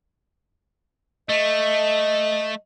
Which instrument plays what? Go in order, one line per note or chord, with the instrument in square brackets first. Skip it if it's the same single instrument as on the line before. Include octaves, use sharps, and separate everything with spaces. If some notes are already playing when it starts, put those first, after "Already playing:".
[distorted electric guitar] A3 [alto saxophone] D#5